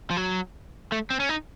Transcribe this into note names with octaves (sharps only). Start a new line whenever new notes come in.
F3
F#3
A3
C4
C#4
D#4